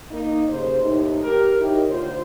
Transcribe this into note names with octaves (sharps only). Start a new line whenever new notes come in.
A#3 D#4
D#2 C#3 C5
D#2 A2 D#4
G4 A#4
D#4 E4 G4 C#5
D2 F4 C5